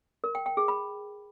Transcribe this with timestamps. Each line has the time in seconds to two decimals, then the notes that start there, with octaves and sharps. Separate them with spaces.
0.24 A#4
0.35 G5
0.46 G5
0.57 G#4
0.68 B5